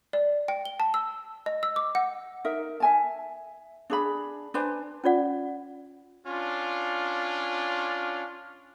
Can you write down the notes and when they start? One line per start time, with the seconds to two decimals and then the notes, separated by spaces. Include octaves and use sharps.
0.13 D5
0.48 G5
0.65 G7
0.80 A5
0.94 E6
1.46 D#5
1.63 E6
1.76 D6
1.95 F#5
2.45 D#4 A#4 E5
2.80 E5 G#5 A5
3.90 D4 G#4 B5
4.54 D4 B4 C5 G#5
5.04 C#4 F4 D5 F#5
6.27 C#4 D4 F4